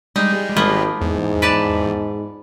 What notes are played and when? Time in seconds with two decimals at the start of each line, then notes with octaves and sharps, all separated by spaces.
0.16 G3 G#3 D#4
0.57 G#1 F3 A#3 B3
1.01 E2 G#2
1.42 B4 D5 A5